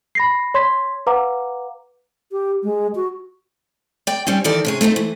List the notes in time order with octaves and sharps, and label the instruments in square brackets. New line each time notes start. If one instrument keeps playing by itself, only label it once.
[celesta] B5 A#6 C7
C#5 C6 G#6 B6
B4 F5 F#5 A#5 D6
[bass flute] G4
G#3
F#4
[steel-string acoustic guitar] D5 G5
G3 C4 C#4
D#3 E3 A4 A#4 D5
C3 C#4 G#4
A3 C4 D#4 F4
E3